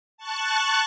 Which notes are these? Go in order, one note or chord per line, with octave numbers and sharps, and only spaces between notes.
A5 C#6 F#6